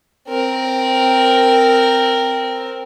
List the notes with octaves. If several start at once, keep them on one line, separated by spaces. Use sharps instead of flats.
C4 A#4